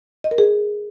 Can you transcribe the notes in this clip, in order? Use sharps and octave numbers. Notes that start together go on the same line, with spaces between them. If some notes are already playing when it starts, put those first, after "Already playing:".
D#5
A#4
G#4